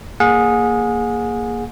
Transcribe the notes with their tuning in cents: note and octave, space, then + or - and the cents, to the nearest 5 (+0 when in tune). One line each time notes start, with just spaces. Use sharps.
A#3 +0 G#4 +0 F#5 -40